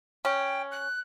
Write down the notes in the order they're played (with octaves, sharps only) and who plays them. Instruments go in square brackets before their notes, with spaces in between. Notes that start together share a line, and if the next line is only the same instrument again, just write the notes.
[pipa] C#4 [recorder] G5
[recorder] F#6